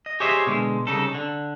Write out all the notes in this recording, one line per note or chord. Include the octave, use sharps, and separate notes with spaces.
D#5
G4 G#4 C5 C#5 D#5 E5
B2 D3 G#3
C2 C#3 D#4 A4
D3